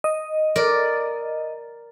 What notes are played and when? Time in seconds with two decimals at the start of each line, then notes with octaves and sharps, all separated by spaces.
0.04 D#5
0.56 A#4 D5